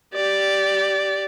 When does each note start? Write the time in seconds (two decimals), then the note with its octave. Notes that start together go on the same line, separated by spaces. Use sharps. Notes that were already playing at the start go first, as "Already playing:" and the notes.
0.14 G4 D5